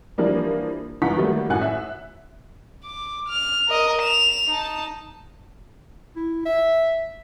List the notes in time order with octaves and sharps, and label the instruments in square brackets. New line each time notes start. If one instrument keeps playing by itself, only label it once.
[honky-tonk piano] E3 F3 G3 A#3 D4
C#2 E3 F#5 A#5 C#6 B6
D#3 F#3 G3 A3 A#3
F#2 A2 F#5 G#5 F#6
E5
[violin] D6
F6
A#4 D#5
E7 F7
D#4 A5
[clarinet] E4
E5